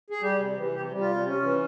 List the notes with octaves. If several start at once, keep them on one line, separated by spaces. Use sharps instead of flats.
G#4
G3 G4
C3
E3
C3 G4
G3
F4
C3
C#4
E3